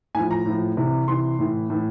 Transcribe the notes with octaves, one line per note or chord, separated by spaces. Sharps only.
A2 F3 G#5
A#5
A2 F3
C3 E3
C3 E3 C6
A2 E3
A2 E3